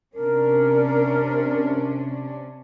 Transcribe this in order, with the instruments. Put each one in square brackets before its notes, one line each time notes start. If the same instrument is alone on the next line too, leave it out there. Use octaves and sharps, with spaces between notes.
[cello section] C3 C#4 D4 [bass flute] A#4